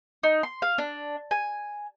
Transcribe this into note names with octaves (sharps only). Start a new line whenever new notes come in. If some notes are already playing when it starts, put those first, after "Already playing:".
D#4
C6
F5
D4
G#5